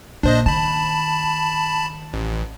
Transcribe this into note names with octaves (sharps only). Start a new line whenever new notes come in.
A#1 D4 C5 D#5
D#3 A5 B5
A1